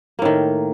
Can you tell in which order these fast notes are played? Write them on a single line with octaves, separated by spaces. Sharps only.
A#3 A2 D#3